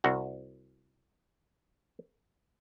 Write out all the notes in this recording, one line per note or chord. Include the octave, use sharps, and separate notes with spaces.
C2 F#4